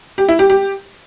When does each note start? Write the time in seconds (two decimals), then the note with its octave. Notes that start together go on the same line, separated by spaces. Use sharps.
0.18 G4
0.29 E4
0.39 G4
0.50 G4